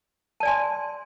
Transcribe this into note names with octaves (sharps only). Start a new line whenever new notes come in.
D5 G#5 A5 C6